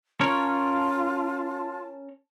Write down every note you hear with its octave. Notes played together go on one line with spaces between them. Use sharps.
C#4 F4 A#4 C#5 A5